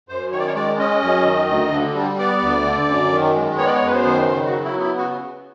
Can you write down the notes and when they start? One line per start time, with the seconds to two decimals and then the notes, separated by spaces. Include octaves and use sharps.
0.09 F#2 C5
0.32 D#3 C#5
0.39 D5
0.47 C#5
0.55 G#3 D5
0.79 C#4 D#5
1.02 F#2
1.25 D#3
1.48 D2
1.72 D3
1.95 G3
2.19 B3 D5
2.41 D2
2.65 D3
2.89 F#2
3.12 D#3
3.35 G#3
3.58 B3 C#5
3.67 D5
3.74 C#5
3.82 F#2
3.87 B4
3.93 C5
4.05 D#3
4.28 C#3 C5
4.46 F#4
4.51 F#3
4.64 E4
4.75 B3
4.81 E4
4.98 C#3 F#4